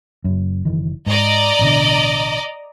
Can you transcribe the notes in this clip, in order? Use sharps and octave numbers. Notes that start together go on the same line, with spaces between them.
F#1 F#2
F#1 D#3 E3
G#2 D5 D#5 A#5
A1 B2 D3